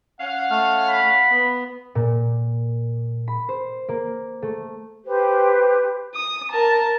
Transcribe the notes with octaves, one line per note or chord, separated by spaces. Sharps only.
C#4 F5 F#5
A3 F6
B5
B3
A#2
B5
C5
A#3
A3
G4 B4 C5
D#6
A#4 A5